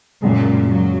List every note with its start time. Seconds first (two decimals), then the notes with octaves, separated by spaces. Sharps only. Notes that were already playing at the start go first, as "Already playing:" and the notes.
0.22 F#2 A#2 C#3 G#3
0.70 F#3